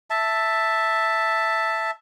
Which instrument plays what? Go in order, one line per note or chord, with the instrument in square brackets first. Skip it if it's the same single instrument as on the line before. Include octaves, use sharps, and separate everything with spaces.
[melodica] E5 A5